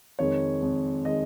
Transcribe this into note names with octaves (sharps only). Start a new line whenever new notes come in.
F2 D#3 G#3 C#5
F2 D#3 G#3
D#3 G#3 D#5